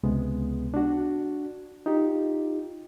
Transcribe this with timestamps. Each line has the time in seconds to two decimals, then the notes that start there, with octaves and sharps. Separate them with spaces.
0.03 C#2 C3 G#3 B3
0.74 D4 F#4
1.86 D#4 F4 G4